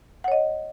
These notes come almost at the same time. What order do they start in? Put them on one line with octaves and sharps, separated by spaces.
F#5 C#5 D#5